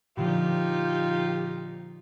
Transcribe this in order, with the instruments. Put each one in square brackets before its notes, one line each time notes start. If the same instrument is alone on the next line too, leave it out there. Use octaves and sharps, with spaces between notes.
[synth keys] A#2 D3 F3 [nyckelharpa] D#4 F4 [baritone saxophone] G4